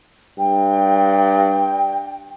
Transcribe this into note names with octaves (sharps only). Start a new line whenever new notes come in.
G2 G5